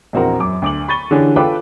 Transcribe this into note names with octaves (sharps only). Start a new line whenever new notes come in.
A#1 E2 C4 F#4 A#4 A#5
F#2 D6
D2 D6 F#7
B5 C#6 A6 D#7 G7
D3 E3 C#4 D4 G4 G#4
F4 A4 B4 G5 D6